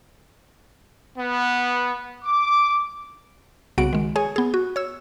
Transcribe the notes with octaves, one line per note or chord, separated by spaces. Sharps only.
B3
D6
C2 C#3 B3 F#4 F#5 D7
D#3 G#3
G#4 C#5 G#5
B3 G#4
F#4
C#5 E6